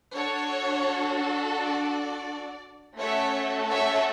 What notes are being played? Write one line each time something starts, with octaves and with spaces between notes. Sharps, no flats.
D4 F#4 A4 C#5
D5
A3 C#4 F#4 A4 C#5 E5
C#5 E5